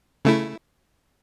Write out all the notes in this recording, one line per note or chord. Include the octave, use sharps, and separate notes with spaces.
C#3 A3 E4